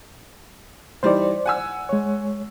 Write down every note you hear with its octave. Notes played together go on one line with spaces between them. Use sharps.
E3 G3 D#4 C5 D5
F#5 G#5 E6
G#3 C#5